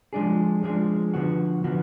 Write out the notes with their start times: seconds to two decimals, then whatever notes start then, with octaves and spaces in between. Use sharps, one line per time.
0.13 F3 G#3 D4 G#4
0.63 F3 G#3 D4 G#4
1.14 D3 F3 B3 F#4
1.64 D3 F3 B3 F#4